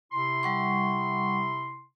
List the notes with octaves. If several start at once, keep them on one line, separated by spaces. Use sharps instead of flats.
C3 E4 C6
G3 F#5 C#6